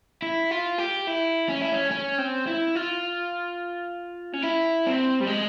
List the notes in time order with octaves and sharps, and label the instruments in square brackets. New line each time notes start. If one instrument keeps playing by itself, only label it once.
[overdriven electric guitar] E4
F4
G4
E4
C#4
E4
C#4
C#4
C4
E4
F4
C#4
E4
C4
G3
G#3